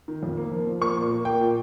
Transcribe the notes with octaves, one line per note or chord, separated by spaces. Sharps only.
D#3
F2
A#3
F3
F3
A#3 C#6
A#2
A#3
A#3 G5
A#2